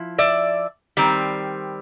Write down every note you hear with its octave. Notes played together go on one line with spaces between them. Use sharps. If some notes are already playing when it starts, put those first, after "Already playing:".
Already playing: F3 E4
D5 E5
D#3 G3 C4